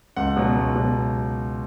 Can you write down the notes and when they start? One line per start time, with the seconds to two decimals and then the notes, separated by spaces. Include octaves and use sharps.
0.17 C#2 F#5
0.37 B2 F#3
0.57 C#2
0.76 B2 F#3